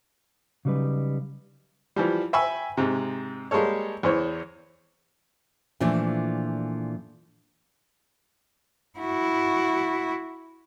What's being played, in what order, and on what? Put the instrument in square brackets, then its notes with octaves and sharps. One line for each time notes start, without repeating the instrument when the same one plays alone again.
[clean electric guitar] C#3 F#3 G3 D#4 B4
[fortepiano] E3 F3 G3
E5 G5 G#5 B5 C#6 E6
G#2 C3
G3 G#3 A#3 A4 C#5
E2 E3 C5 C#5
[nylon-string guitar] A#2 E3 F3 A3 D4 E4
[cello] E4 F#4